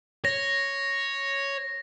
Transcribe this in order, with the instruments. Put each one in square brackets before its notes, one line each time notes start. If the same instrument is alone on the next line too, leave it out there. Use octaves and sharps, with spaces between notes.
[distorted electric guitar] C#5 [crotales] A#6